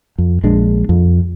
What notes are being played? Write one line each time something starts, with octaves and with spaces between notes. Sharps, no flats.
F2
A#1 G#3 D4
F2